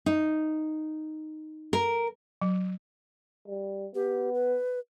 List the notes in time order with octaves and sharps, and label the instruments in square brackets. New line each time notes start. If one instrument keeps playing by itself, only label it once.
[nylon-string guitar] D#4
A#4
[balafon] F#3
[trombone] G3
[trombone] B3 [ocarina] G4
[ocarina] B4